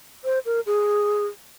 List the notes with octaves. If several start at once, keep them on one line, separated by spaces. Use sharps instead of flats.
C5
A#4
G#4